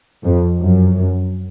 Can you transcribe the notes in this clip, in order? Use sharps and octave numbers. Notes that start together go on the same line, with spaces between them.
F2
F#2